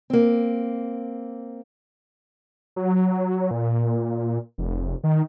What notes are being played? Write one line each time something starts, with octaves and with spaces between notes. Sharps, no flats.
A#3 C4
F#3
A#2
F1
D#3